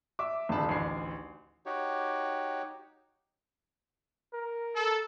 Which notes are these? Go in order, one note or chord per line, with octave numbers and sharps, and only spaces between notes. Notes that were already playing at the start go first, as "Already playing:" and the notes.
E5 D6
D#1 D2 C#3 D#4 A5 B5
A1 D2 D#4 G#5 C7
D#4 F#4 G4 C#5
A#4
A4